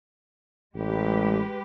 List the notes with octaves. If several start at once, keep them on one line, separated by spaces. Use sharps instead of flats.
A1 G#3 G4 B4